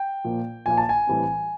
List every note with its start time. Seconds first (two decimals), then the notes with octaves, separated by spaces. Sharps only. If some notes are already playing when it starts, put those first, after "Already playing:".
Already playing: G5
0.24 A#2 F3 A#3
0.66 A#2 F3 A#3 G#5
0.78 A5
0.89 G#5
1.07 A2 E3 G3 C4